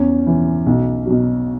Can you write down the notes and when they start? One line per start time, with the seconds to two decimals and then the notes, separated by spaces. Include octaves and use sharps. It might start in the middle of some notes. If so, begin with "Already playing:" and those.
Already playing: E2 C#4
0.27 E3
0.66 B1
1.06 B2 F#3